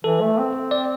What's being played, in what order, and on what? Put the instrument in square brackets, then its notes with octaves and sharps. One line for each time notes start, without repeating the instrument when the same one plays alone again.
[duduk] E3 [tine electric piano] A4
[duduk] A3
C4
[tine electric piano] D5